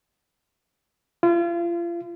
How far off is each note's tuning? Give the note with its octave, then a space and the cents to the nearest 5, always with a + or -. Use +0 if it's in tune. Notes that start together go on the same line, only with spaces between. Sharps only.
F4 -35